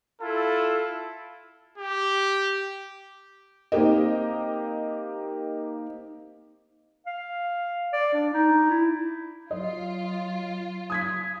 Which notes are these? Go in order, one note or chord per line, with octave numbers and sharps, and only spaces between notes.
E4 F4 A4
G4
A#3 C4 D#4 G4 A#4 D#5
F5
D5
D4
D#4
E4
F#3 F4 D#5
D#6 G#6 B6